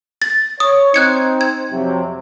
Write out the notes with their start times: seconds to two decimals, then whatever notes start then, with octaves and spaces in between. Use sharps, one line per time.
0.22 A6
0.60 C#5 D#6
0.94 C4 D#4 F#6 G#6 C#7
1.41 G#6
1.72 F2 C3 F#3